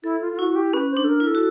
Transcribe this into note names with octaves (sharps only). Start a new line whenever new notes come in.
E4 A4
F4
F4
E4 F#4
F#4
G4
C#4 B4
C5
D4
A4
A#4
E4
A4
F#4